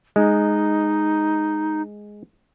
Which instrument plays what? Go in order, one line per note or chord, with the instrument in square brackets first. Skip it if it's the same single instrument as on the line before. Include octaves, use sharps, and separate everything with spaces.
[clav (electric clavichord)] G#3 [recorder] D#4